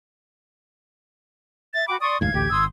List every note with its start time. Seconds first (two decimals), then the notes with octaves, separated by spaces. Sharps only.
1.74 E5 A6
1.88 F#4 G5 B5 D6
2.01 D5 C6 C#6 D#6
2.21 F#1 D2 G#2 F5 G#6
2.34 A1 D2 G4
2.51 G#1 C6 D#6 E6